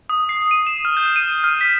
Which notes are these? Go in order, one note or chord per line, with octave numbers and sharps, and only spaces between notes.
D#6
C7
D#7
E7
F6
G6
D#7
F6
B6